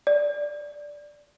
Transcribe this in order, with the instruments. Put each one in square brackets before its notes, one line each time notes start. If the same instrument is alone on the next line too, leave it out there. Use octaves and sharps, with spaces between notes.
[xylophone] D5